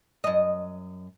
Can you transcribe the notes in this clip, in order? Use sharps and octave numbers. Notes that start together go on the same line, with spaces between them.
F#2 D#5